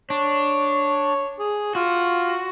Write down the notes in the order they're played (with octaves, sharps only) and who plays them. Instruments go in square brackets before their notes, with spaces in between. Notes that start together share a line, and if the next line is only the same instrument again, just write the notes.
[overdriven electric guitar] D4 [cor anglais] C#5
[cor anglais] G#4
[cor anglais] F4 [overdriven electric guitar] F#4